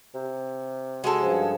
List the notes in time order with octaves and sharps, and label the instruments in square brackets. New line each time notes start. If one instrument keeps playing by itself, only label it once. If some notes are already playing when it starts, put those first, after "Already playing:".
[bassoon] C3
[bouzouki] G#3 G#4 A4 [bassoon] F#4
[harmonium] G2 C#3 F3